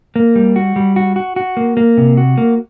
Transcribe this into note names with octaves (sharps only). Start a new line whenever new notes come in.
A#3
G3
F#4
G3
F#4
F#4
F#4
A#3
A#3
C3
F#4
A#3